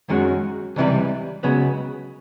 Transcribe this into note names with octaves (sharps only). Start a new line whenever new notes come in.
F#2 D#3 G#3 C#4 F#4
C#2 C3 E3 G3
C#2 C#3 F#3 B3